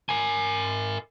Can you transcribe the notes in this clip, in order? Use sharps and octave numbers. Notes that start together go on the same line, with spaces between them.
A#4 G#5